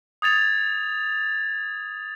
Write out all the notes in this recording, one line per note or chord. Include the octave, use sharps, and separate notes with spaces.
D#6 G#6 A6 F7